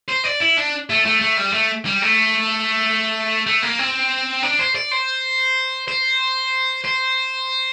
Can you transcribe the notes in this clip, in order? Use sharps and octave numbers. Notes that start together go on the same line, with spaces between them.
C5
D5
E4
D4
A3
A3
A3
G3
A3
G3
A3
A3
A#3
C4
D4
C5
D5
C5
C5
C5